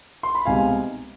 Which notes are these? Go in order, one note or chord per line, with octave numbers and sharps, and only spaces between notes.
C6
B5
C2 B2 G#3 C4 D#4 F5 G#5